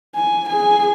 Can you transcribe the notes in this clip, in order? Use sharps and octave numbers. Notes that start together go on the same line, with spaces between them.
G#5
G#4 G#5